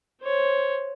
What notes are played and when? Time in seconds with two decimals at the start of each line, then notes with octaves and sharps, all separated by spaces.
0.23 C5 C#5